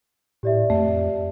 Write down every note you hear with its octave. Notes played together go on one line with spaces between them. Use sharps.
A2 G4 D5 E5
F2 A3